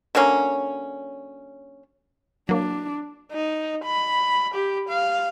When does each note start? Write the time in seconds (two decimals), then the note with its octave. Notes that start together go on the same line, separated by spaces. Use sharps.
0.15 D3 F#3 A#3 C#4
2.49 F#3 A#3 D4
3.32 D#4
3.84 B5
4.54 G4
4.89 F5